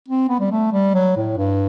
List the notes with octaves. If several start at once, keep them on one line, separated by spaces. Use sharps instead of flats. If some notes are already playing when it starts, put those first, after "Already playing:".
C4
B3
G3
A3
G3
F#3
A2
G2